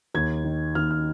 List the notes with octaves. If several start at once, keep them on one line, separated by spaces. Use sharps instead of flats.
D#2 G#6
D#3
D#2 F6
F6